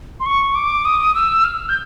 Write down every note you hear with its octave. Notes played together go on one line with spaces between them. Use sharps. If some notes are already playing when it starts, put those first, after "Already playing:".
C6
C#6
D6
D#6
E6
F6
G6